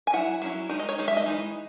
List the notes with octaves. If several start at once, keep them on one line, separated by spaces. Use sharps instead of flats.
G#5
F#3 C#4 E4 F#5
F#3 C#4 E4
D#3 G#3 D#4
D#5
C#5
D#3 G#3 D#4
E5
D#5
E3 G#3 D#4